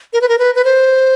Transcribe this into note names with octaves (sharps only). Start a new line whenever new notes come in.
A#4
B4
A#4
B4
B4
C5